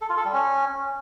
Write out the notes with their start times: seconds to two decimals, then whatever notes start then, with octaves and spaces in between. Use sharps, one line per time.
0.01 A4
0.09 F4
0.17 A4
0.25 G3
0.33 C#4